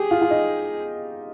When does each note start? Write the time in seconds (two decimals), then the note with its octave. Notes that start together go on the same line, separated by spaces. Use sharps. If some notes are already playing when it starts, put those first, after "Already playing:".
Already playing: G4 G#4
0.11 F4
0.21 F4
0.31 D#4